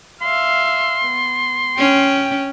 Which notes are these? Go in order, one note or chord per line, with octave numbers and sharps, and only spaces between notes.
E5 F5 C6
B3
C#4 G5